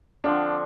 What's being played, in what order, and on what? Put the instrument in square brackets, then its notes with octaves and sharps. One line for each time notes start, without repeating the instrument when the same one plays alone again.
[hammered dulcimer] D3 F3 C4 [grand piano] D4